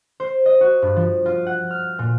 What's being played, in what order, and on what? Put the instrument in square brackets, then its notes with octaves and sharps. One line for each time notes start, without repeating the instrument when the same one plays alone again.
[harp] C5
D#5
F#4
G2
F3
F4
F#5
F6
A#2